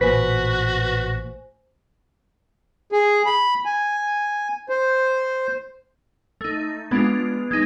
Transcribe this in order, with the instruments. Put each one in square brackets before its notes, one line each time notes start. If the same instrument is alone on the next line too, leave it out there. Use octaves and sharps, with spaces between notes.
[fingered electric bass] A1 A#2 [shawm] F#4 [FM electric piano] B4 B6 [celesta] C5 G#5
[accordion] G#4
B5
G#5
C5
[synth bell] A3 D#4
[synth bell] G#3 D4 F4 [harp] B3
[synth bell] G#3 D#4